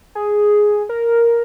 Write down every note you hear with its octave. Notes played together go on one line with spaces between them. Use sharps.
G#4
A#4